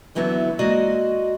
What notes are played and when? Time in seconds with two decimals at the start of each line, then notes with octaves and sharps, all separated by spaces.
0.15 D3 E3 F#3 B3 E4
0.59 G#3 A#3 F#4 D5 D#5